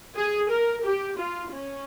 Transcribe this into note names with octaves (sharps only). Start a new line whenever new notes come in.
G#4
A#4
G4
F4
C#4